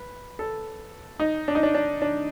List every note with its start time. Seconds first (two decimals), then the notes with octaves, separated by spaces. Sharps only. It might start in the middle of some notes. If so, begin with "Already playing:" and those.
Already playing: B4
0.39 A4
1.20 D#4
1.48 D4
1.55 D#4
1.63 D4
1.75 D4
2.02 D4